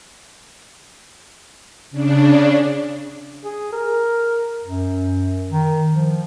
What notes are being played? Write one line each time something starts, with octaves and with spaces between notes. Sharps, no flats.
C#3 D4
G#4
A#4
F#2
D#3
F3